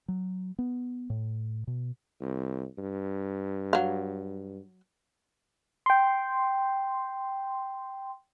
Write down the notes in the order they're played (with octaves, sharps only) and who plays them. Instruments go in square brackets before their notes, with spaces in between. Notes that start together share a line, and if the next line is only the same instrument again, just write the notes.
[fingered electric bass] F#3
B3
A2
B2
[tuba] C2
G2
[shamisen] F#3 F5
[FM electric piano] G5 C6